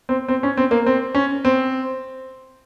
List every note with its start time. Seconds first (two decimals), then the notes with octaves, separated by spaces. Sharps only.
0.09 C4
0.28 C4
0.43 C#4
0.57 C4
0.71 A#3
0.86 C4
1.15 C#4
1.45 C4